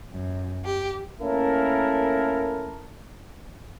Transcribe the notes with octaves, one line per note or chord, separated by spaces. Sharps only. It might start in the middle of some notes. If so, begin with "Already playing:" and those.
F#2
G4
A3 A#3 C#4 E4 A4 A#4